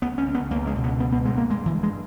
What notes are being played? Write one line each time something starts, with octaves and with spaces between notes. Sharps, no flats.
C#2 B3
C#4
C#2
B3
C#2 A#3
G#3
B2
B3
G2 B3
B3
G2 G#3
A#3
G2 G#3
E3
G2
G#3